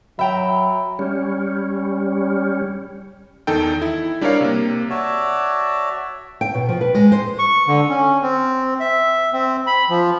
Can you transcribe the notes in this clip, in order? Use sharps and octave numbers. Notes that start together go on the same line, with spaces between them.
F#3 E5 G5 A#5 B5
G3 C#4
E2 D#3 D#4 A4 G5
E4
G3 D4 G4 A#4 C#5 F5
C3 A#3
F#4 C#5 D5 E5 A5
G5
B2
F3
B4
G#3
C5
C#6
D3
C#4
C4
E5
C4
B5
F3